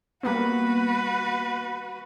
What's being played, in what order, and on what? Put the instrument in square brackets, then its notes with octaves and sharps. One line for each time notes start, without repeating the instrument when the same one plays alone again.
[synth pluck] G3 A#3 B3 [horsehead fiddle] F#4 B4